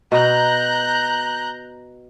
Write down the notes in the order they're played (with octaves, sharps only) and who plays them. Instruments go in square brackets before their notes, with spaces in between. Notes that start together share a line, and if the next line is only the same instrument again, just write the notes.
[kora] B2 [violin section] A#5 F#6 G6